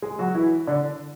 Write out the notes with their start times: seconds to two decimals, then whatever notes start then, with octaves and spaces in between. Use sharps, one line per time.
0.02 G#3 G#4
0.19 F#3 F#4
0.34 E3 E4
0.67 D3 D4